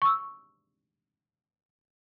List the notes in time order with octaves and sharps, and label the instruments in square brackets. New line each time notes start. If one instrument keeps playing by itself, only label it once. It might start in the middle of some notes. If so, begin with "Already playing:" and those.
[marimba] C#6 E6